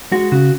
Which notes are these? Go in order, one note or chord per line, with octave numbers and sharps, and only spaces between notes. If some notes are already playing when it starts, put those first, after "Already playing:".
G#3 F#4
C#3 F#4